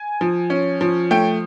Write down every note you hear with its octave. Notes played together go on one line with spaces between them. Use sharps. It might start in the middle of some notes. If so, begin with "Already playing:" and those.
Already playing: G#5
F3
C#4
F3
A3 G5